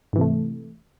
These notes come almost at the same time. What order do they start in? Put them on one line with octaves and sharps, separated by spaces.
G#2 E3 C3 A3